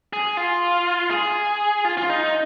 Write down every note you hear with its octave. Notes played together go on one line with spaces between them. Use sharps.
G#4
F4
G#4
F4
F4
D#4